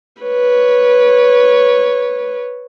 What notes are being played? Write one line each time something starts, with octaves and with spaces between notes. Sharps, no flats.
B4 C#5